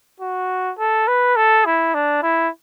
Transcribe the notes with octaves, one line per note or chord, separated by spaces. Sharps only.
F#4
A4
B4
A4
E4
D4
E4